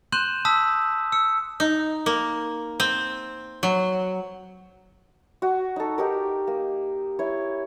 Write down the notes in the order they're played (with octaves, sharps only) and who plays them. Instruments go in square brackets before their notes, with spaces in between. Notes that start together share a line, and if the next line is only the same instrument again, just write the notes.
[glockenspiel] C6 F#6 G6 D#7 E7 F#7
A5 D#6 E6 B6
E6 C#7
[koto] D#4
A#3
C4
F#3
[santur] F#4
D#4 A4
D#4 G4 A#4
A#3
E4 C#5